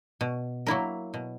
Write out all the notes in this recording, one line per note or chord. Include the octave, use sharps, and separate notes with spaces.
B2
F#3 A#3 E4 A#4
B2